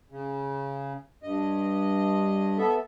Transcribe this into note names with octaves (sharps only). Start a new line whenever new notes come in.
C#3
G2 D#5
B3 A4 E5